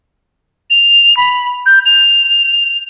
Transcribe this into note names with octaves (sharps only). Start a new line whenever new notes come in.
F7
B5
G6
F7